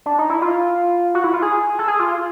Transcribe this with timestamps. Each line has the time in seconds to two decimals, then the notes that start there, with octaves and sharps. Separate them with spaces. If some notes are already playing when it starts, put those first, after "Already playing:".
0.06 D4
0.18 D#4
0.30 E4
0.42 F4
1.15 F#4
1.24 E4
1.33 F4
1.42 G#4
1.79 A4
1.88 G#4
2.00 F4